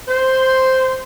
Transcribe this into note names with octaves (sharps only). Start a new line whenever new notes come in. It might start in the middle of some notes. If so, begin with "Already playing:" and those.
C5